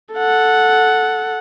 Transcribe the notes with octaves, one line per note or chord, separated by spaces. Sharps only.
A4 F#5